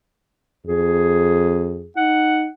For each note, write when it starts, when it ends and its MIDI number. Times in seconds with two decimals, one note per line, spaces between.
0.66 1.87 41
0.66 1.90 68
1.97 2.47 63
1.97 2.47 78